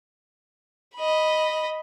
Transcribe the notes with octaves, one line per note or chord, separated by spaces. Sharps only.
D#5 B5